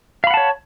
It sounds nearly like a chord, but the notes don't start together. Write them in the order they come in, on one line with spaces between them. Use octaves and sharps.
F5 B5 F#5 A5 C#5